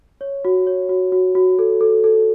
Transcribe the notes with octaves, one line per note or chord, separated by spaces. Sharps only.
C#5
F#4
C#5
F#4
F#4
F#4
A4
A4
A4